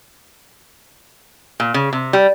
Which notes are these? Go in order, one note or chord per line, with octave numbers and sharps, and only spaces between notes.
A#2
C#3
C3
G3